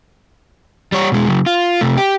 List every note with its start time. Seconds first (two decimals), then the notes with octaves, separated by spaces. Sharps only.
0.92 G3 C#5
1.12 B2 G#3
1.28 C#3 F#3
1.46 F4
1.81 C3 A3
1.97 G4